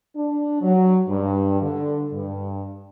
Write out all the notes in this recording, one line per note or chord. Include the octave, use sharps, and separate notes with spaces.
D4
F#3
G2
D3
G2